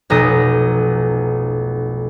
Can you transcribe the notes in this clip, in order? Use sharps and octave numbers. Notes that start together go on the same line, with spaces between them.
F1 B1 A#5 D#6